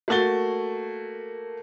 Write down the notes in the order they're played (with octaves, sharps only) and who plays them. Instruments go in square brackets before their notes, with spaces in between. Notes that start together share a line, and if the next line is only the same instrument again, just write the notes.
[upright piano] A3 A#3 F#4 A6 G7